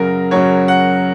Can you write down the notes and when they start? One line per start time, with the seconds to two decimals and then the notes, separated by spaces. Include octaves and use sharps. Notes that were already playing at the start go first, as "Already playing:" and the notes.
Already playing: F#2 C#3 F#3 A#4
0.31 F#2 C#3 F#3 C#5
0.68 F#5